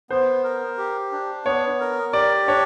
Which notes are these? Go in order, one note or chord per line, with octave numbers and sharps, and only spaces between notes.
B3 C5
A#4
G4
D4
B3 C#5
A#4
G4 D5
D4 C#5